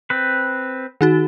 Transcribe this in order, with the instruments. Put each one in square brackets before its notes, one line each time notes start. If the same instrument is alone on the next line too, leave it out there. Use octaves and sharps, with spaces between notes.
[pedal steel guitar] C4 B4
[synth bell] D#3 D#4 F#4